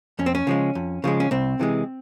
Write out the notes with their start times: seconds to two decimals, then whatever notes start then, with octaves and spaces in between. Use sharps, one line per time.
0.19 F2 C#4
0.26 C4
0.35 C#4
0.47 C#3 F3 G#3
0.75 F2
1.04 C#3 F3 G#3
1.20 C#4
1.31 C2 C4
1.60 C3 E3 G#3